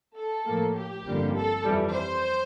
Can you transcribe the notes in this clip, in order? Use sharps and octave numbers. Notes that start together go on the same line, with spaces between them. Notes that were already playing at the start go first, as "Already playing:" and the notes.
A4
A2 F3 A#3
G4
G1 F2 D3 G3 A#3
A4
F2 E3 G3
C5